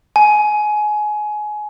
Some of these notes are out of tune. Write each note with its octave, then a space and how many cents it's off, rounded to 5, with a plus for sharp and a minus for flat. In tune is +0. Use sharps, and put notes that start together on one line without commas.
G#5 +25